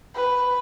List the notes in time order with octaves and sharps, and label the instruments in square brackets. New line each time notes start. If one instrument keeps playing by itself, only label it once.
[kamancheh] B4